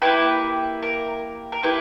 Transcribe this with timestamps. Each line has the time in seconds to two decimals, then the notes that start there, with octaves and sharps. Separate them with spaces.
0.02 A#3 E4 G4 B4
0.82 A#4
1.52 A#4
1.63 A#3 E4 G4 B4